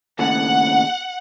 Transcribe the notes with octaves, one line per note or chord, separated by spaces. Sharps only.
D#2 A2 C#3 F#5